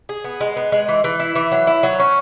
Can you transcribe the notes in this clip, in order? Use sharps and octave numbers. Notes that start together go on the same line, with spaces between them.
G#4
B3
G#3
B3
G#3
E3
E3
E4
E3
F#3
E4
F#3
C#4